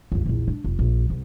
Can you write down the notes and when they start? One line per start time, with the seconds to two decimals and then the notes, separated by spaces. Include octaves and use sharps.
0.12 C#2 G2
0.26 A#1 E2
0.48 D4
0.64 F1
0.79 A#1
1.10 C2